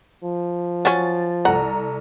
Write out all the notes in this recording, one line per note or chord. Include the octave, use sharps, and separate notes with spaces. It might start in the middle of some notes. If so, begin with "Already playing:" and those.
F3
F#3 C#4 A6
C2 A4 F#5 A#5